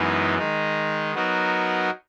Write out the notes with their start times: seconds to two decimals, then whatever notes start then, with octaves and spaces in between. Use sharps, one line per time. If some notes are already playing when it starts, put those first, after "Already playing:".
Already playing: F#2 E3 G#3 B3 D#4
0.38 D#3 G#3 D#4
1.14 F#3 B3 D#4 F#4 A#4